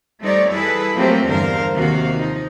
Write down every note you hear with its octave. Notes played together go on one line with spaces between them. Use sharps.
G3 A3 C4 D#4 C#5 D5
E3 G3 E4 G#4 A4 B4
F3 F#3 A3 A#3 C4 G4
E2 G2 D3 A#4 C5 F5
D#2 C3 F3 A#3 F#4 F5
F3 D#4